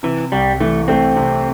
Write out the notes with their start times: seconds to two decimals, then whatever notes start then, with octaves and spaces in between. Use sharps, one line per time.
0.03 C3 E3
0.32 C2 G3
0.60 E3 A3
0.88 A3 C4
1.16 C3